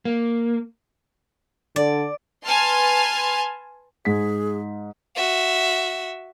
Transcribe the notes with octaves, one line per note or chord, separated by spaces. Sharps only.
A#3
D3 D5
B4 G#5 A5 C6 F6
G#2 G#4 B6
F#4 E5